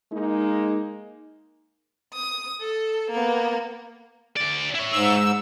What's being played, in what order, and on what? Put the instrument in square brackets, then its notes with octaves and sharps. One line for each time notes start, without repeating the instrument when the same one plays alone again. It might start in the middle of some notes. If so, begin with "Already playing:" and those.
[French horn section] G#3 A#3 D#4
[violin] D#6
A4
A#3 B3
[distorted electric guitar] D2 D5
E4 C#5
[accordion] G#2 E6